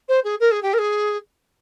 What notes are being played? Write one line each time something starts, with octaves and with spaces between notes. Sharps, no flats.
C5
G#4
A#4
G#4
G4
A#4
G#4